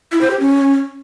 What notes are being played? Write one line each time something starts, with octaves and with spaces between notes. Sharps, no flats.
E4
C5
G4
C#4